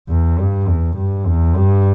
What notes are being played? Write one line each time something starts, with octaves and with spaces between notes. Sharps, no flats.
E2
G2
E2
G2
E2
G2